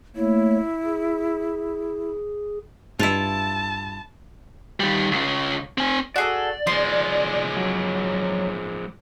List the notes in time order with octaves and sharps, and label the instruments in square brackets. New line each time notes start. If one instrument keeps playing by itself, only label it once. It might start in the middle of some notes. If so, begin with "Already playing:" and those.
[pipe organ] A3 A#3 C#5 [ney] E4
[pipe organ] G#4
[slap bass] G2 [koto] E4 F4 [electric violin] A5
[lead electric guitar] D#3 G3
C#2 C#3
C4 G#5
[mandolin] F#4 G#4 A4 [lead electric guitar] D5
[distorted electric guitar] F3 G#3 [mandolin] C6
[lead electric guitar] F#3